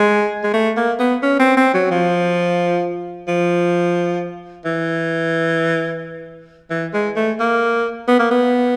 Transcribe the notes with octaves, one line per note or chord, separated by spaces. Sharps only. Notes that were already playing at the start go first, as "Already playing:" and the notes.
Already playing: G#3
G#3
A3
A#3
B3
C#4
C4
C4
F#3
F3
F3
E3
E3
G#3
A3
A#3
B3
A#3
B3